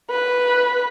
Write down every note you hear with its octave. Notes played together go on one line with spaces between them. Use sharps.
B4